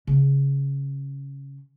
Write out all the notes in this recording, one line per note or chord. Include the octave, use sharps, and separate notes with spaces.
C#3 C#4